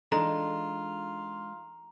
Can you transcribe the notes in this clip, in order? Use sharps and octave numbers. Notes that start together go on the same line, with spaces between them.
E3 G#3 D4 D#4 F4 A4 A#5